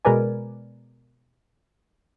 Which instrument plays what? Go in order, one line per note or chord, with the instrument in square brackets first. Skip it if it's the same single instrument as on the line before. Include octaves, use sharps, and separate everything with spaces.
[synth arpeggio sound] B2 G#3 A#4 B4 D5 G#5